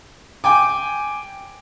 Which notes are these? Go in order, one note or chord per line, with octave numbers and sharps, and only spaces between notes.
G5 G#5 D6